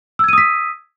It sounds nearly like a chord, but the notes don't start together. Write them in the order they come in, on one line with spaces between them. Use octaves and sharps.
E6 G#6 D#7 D#6 B6